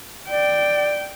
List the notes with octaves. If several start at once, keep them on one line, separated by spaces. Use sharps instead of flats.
D5 G5